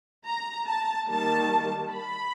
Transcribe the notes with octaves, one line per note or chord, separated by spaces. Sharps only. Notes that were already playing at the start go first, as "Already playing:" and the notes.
A#5
A5
D#3 G3 A#3 A5
B5